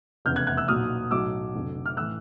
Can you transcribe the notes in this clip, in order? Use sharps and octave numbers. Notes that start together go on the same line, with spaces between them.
F1 E2 C#3 F6 G6
F#6 G#6
F#6 G#6
E6 F#6
B1 A#2 F#3 D#6 F6
B1 A2 F#3 D6 E6
F1 F2 D3 F#3
F6
A2 E3 E6 F#6